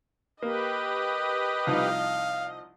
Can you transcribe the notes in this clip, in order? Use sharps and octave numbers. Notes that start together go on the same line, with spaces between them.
A#3 G4 B4 D#5
C2 F3 D#4 F5